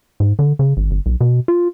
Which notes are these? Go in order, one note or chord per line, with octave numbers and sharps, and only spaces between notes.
G#2
D3
C#3
G#1
G1
B1
B2
F4